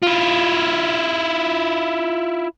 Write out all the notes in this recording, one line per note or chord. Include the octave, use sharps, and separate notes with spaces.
E4 F4